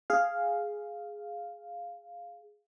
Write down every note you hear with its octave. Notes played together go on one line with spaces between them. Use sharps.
G#4 F5